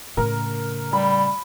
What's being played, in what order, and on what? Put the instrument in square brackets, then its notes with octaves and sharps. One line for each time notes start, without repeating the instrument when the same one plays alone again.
[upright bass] A2 C#3 [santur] A#4
[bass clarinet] G3 [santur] B5